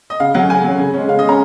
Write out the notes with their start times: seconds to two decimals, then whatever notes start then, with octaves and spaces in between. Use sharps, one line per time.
0.10 D#5
0.20 C#3 F5
0.34 F#3 C#4 F#5
0.50 C#3 G#5
0.64 F#3 C#4
0.79 C#3
0.94 G#3 C#4
1.08 C#3 F5
1.19 D#5
1.24 G#3 C#4 A#5